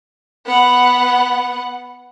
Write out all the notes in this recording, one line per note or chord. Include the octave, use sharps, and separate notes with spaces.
B3 F#5